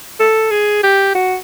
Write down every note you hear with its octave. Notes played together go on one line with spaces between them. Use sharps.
A4
G#4
G4
F#4